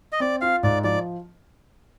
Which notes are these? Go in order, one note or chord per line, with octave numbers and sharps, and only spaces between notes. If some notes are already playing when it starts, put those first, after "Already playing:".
D#5
C4 D5
F4 F5
G#2 D5
F3 D5